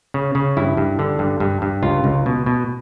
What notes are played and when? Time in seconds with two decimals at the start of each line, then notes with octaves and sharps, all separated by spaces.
0.14 C#3
0.35 C#3
0.57 G2 E4
0.77 G2
0.99 D3
1.19 G2
1.40 G2
1.62 G2
1.83 C#2 F4
2.04 C#2
2.26 B2
2.46 B2